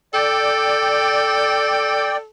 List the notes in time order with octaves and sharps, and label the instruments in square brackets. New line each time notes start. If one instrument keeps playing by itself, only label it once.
[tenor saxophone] A4 [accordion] D5 G5